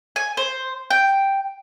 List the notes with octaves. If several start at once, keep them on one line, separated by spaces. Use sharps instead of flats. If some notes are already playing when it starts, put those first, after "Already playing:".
G#5
C5
G5